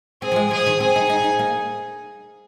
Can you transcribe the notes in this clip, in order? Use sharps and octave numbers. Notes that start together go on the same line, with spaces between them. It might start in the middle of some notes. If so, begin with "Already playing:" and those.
C4 G#4
F3
G#3
F3 G#4
D#3
C4 G#4
D#4
D#4
D#4
A#3